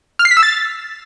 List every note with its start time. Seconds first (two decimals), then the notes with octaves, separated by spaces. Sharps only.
0.19 F6
0.25 C7
0.31 B6
0.37 E6
0.43 A6